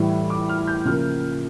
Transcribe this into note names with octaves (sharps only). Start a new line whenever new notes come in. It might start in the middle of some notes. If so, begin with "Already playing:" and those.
Already playing: A2 E3 G3
D6
F6
G6
C#3 F3 A#3 F6